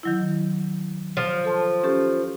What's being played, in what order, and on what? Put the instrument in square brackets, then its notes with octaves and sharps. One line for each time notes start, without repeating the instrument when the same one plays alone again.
[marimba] D#3 F#3 E4
[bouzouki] F3
[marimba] A4 A5 C6
C#4 G4 A4